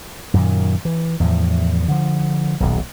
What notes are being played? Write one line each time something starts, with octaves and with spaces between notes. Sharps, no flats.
F#2 A#2 D#3
E3
E2 A2 F3
D3 F3
D#1 B1